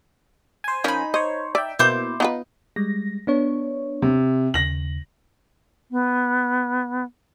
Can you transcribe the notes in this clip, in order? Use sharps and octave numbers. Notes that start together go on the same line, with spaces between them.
C5 G#5
F3 C#4 D#4 A#4 B5
C5 C#5 D#5
D5 E5 G5
B2 A#3 E4 C5 D6 G6
B3 D#4 F4 B4
G3 G#3 A#6
B3 D4 C#5
C3
D#2 C#3 A#6 F#7
B3